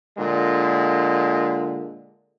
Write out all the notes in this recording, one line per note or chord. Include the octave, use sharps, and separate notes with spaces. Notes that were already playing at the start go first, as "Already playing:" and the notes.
A#2 D3 G#3